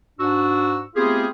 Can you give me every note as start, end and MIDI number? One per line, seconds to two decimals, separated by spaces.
0.20 0.81 44
0.20 0.81 62
0.20 0.81 66
0.20 0.81 88
0.96 1.26 57
0.96 1.26 59
0.96 1.26 60
0.96 1.26 65
0.96 1.26 67
0.96 1.26 68